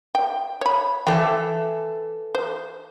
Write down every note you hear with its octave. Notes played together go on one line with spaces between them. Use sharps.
G5
C#5 B5
E3 A4 C5 E5 G5
C5